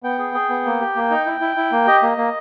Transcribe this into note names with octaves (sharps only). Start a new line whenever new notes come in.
B3 G5
G#4
G#4
B3
A#3
G4
A#3
D#4
E4
E4
E4
A#3
G4 D#5
A#3
A#3